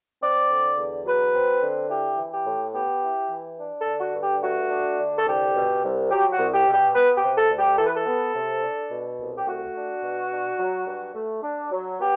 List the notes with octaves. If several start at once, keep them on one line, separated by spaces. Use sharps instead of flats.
C4 D5
D3
E2
F#3 B4
C4
D3
E4 G4
E3
G4
A2
B3 G4
E4
E3
D4
A4
D3
F#4
G2
G4
A3 F#4
D4
D3
A4
C2 G4
B2
C2
F#3 G4
F#4
C2
G4
B2
G4
B3 B4
G4
C3
A4
D2
G4
E3 A4
B4
A4
B3
C3
D4
B2
C2
G4
A3 F#4
D4
B2
D4
F#3
G2
A3
D4
F#3
B3 G4